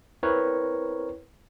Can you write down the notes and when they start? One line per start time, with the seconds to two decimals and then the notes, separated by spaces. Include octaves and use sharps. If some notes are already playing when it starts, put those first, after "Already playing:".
0.23 C4 E4 A#4 B4 C#5